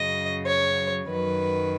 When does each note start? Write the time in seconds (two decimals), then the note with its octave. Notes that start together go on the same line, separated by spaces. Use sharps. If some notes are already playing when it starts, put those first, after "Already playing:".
Already playing: F#2 C#3 F#3 D#5
0.47 C#5
1.09 F#2 D#3 F#3 B4